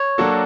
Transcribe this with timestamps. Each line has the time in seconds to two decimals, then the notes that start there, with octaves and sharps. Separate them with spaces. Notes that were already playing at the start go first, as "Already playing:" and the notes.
Already playing: C#5
0.18 F#3 A#3 D4 F#4 A4